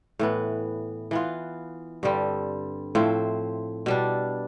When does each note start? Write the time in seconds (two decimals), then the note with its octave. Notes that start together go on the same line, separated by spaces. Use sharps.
0.19 A2 E3 B3
1.11 E3 B3 F4
2.03 G2 D3 G3 C4
2.95 A2 F3 C4 E4
3.86 B2 G3 D4